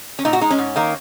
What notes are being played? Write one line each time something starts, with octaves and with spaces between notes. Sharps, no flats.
C#4
A#2 D#4
F#4
G#3 D#4
C#4
G#2
D#3 A#3